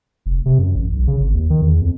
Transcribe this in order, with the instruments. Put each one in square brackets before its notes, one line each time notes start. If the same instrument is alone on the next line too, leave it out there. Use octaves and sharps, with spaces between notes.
[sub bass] F1
C3
F#2
A1
B1
C#3
G#1
D#2
D#3
E2
F2